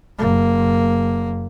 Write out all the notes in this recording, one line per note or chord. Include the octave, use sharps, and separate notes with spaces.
F#1 A#3